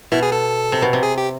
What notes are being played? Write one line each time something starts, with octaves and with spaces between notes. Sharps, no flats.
B2 E4
G#4
A4
C3
B2
C3
G#4
G4